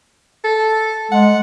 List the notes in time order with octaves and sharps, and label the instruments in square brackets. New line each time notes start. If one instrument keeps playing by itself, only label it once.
[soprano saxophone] A4
[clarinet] G#3 [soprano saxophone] F#5